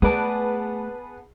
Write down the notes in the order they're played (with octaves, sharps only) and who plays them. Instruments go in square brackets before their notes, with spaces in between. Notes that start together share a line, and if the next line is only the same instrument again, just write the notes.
[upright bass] A3 [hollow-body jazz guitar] B3 D5 [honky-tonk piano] G#4 B4 A5